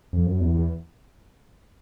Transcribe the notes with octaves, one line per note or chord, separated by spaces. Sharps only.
F2
F#2
E2
E2